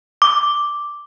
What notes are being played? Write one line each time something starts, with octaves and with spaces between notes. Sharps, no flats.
D6